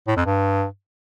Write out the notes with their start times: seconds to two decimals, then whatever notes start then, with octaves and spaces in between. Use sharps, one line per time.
0.07 A2
0.16 F2
0.26 G2